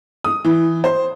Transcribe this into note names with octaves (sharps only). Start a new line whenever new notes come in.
D#6
E3
C5